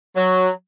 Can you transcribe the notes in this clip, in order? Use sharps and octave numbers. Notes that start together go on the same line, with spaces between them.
F#3